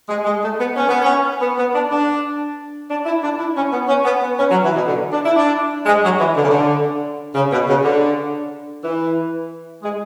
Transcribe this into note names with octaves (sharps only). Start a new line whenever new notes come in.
G#3
G#3
A3
B3
C#4
B3
C#4
B3
B3
D4
D4
D4
E4
D4
E4
C#4
B3
C#4
B3
B3
C#4
F#3
E3
B2
D3
D4
E4
D4
G#3
F#3
E3
D3
C#3
D3
C#3
B2
C#3
D3
E3
G#3